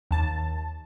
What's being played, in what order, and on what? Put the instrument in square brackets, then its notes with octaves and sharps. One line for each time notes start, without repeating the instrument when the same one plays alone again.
[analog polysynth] D#2 A5